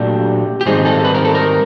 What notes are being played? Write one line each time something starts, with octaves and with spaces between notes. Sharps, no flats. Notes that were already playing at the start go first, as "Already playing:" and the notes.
Already playing: A#2 F#3 A3 D4 G4
G4
G#2 D#3 G3 C4 D#4 G#4
A4
B4
A#4
A4
A#4